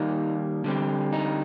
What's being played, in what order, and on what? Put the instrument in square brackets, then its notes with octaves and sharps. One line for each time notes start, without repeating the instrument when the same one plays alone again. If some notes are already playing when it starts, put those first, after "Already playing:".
Already playing: [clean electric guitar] D#3 G3 A#3 D#4
D3 G3 C4
D#4